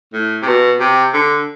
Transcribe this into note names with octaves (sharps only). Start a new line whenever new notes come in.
A2
C3
B2
C3
D3